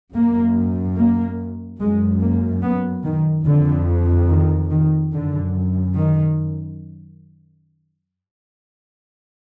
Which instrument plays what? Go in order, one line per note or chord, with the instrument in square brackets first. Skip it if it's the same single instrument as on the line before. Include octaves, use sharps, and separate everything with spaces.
[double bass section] F#2 A#3
A#3
F#2 G#3
A#3
B3
D#3
F2 D3
D#3
D#3
F#2 D3
D#3